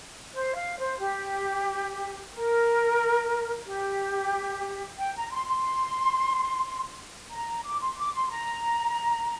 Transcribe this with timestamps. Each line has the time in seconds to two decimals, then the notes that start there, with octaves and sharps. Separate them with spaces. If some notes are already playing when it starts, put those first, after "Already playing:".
0.34 C5
0.56 F5
0.78 C5
0.99 G4
2.33 A#4
3.66 G4
4.98 G5
5.16 A#5
5.31 C6
5.48 C6
7.31 A#5
7.65 D6
7.81 C6
7.98 D6
8.14 C6
8.30 A#5